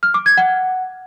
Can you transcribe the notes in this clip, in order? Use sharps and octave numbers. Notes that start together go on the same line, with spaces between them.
F6
D6
G#6
F#5